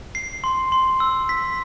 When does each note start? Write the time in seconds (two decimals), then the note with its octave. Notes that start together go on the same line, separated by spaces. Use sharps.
0.15 C7
0.44 C6
0.72 C6
1.00 E6
1.29 B6